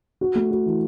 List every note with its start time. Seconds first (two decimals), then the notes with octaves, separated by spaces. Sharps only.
0.21 F#4
0.35 A3
0.51 F#4
0.66 E3